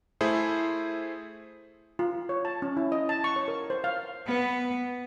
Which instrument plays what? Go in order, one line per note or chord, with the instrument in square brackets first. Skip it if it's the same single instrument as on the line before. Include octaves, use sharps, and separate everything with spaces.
[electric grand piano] A3 E4 G#4 C5
[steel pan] F4
C#5
A5
C#4
E4
D#5
A5
C#6
C#5
A#4
C5
F5
[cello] B3